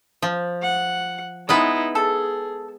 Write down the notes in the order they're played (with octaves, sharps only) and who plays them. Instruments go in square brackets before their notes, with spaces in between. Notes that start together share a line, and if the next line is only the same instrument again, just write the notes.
[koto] F3
[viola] F#5
[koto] G#3 B3 B4 [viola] D#4 E4
[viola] G#4 [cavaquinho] A4